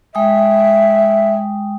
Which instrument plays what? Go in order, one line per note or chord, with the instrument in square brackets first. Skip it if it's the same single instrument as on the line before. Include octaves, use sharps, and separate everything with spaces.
[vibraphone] G#3 G5 D#6 [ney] E5